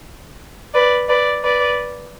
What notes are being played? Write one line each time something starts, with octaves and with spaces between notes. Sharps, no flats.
B4 D5
B4 D5
B4 D5